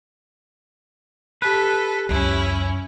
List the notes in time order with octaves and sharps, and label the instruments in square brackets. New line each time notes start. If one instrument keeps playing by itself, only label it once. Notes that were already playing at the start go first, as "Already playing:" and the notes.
[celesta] G4 B6 [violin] A4 [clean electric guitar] B4
[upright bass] C#2 F#2 [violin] C#4 E4